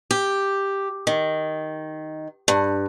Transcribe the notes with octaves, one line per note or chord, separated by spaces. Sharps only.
G4
D#3
G2